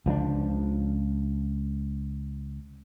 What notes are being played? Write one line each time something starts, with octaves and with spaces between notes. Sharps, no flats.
C#2 F3 G3 D4